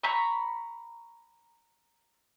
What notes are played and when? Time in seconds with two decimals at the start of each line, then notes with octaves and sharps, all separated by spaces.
0.03 A#5 B5 C#6